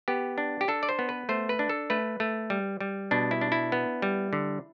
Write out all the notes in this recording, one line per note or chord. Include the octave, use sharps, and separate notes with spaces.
B3 G4
D4
G4
D4 A4
D5
C5
B3
B4
A3 C5
B4
D4
A4
A3 B4
A3
G3
G3
B2 D4
E4
D4
E4
B3
G3
D3